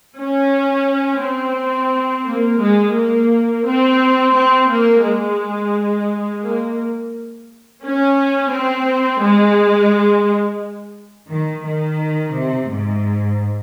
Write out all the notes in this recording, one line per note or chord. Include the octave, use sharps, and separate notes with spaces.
C#4
C4
A#3
G#3
A#3
C4
C4
A#3
G#3
A#3
C#4
C4
G#3
D#3
D#3
C3
G#2